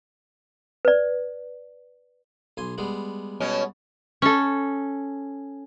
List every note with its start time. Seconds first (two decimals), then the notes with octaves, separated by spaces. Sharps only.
0.85 B4 D5
2.57 B1 G#5 C6
2.78 G3 G#3 B3
3.40 B2 C#4
4.22 C#4 A4